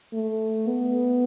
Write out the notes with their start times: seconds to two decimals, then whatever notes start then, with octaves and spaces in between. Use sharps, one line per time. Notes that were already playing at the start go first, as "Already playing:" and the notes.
0.13 A3
0.67 B3